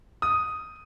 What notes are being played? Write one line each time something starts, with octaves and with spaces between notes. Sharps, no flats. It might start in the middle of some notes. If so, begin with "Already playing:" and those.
D#6